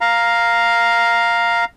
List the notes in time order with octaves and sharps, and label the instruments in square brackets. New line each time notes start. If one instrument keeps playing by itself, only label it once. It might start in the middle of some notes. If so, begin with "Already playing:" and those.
[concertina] F5 A#5